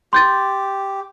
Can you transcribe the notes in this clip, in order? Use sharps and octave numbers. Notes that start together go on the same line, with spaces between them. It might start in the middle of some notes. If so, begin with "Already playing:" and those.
G4 C6 G6 A6